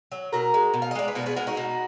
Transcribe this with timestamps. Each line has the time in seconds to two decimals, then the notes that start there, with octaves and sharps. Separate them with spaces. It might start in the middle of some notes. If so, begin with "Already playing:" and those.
0.12 F#3
0.32 B2 F#4 A#4
0.54 G#3
0.74 B2
0.82 F5
0.91 D#5
0.95 G#3 D5
1.08 B4
1.15 B2 F#4 A#4
1.26 G#4 B4
1.36 G#3 F#4 A#4
1.47 D#4 F#4
1.57 B2